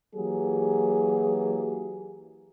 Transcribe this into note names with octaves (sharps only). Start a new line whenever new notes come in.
E3 F#3 A#3 G4 G#4